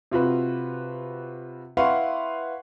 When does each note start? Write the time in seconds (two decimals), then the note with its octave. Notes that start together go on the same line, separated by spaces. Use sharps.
0.12 C3 F4 F#4 B4
1.77 E4 B4 F5 F#5 C6 C#6